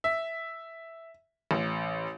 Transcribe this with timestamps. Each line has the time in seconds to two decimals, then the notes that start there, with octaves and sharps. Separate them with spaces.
0.04 E5
1.51 A1